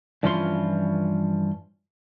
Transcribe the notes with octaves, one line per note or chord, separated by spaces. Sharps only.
G2 E3 F3 C#4 F4 C6